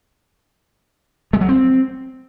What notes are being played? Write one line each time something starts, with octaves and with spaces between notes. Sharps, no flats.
G#3
F#3
C4